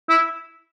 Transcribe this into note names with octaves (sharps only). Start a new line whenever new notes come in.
E4